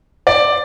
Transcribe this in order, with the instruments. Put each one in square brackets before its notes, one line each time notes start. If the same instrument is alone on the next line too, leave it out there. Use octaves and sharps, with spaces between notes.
[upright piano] D5